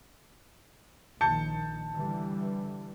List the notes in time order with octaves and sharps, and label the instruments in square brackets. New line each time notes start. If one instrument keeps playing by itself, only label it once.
[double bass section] A#1 D#3 [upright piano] A5 G6 C#7
[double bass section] D3 E3 G3